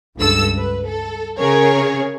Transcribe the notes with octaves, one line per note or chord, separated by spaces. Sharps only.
C#2 G2 A4 E6
B4
A4
C#3 G#4 A#4 C#5